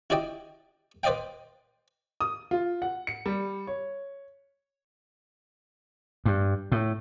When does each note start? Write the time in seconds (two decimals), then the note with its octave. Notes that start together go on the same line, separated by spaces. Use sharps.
0.10 E4 F#4 D5 D#5 G5
1.03 B4 C5 D5 D#5 F5 G5
2.21 D#6
2.51 F4
2.82 F#5
3.07 C#7
3.26 G3
3.67 C#5
6.25 G2
6.72 A2